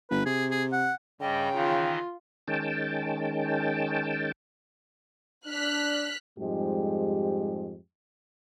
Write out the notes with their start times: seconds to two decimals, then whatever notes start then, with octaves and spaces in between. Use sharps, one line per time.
0.10 G1 B4
0.26 C3 G#4
0.51 G#4
0.72 F#5
1.21 G2 C#3 G3 D#5 G5
1.54 D#3 E3 D#4 F4
2.48 D#3 G#3 C#4 G5 A5
5.47 D4 F6 F#6 B6
6.38 F2 G#2 G3 G#3 G4